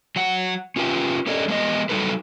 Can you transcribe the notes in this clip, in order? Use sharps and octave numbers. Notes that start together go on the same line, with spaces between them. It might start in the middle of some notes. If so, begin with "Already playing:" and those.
F#3 F#5
C#4 F4 G4 B4 G5
C#4 G4 A4 D5 D#5
G#3 B3 G4 D#5
F#3 G3 D#4 A4 B4